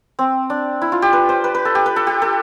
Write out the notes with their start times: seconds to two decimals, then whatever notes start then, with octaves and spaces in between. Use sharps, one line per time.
0.19 C4
0.50 D4
0.82 E4
0.92 F4
1.02 G4
1.13 B4
1.29 C5
1.44 B4
1.55 B4
1.65 A4
1.75 G4
1.86 B4
1.96 A4
2.07 G4
2.22 A4